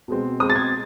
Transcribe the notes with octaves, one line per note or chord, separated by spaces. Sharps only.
B2 G#3 C4
B2 G#3 C4 D#6
A6
G#6